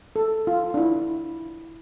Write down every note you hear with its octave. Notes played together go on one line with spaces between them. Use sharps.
A4
F4
D4
E4